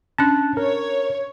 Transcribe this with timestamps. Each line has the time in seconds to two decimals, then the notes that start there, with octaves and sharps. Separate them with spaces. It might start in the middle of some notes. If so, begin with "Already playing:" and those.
0.18 C#4 D4 A5 F#6
0.57 A#4 C#5